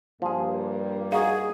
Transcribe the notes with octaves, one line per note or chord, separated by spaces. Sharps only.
G2 F3 G3 A#3 G#4
D#4 F#4 G#4 F5